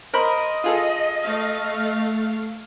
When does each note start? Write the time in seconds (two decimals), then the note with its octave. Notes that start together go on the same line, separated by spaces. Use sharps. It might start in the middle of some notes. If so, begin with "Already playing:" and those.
0.14 A#4 C5 D#5 B5
0.64 F4 G#4 A4
1.23 A3 F5